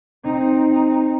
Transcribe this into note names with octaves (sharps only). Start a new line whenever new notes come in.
C4 D#4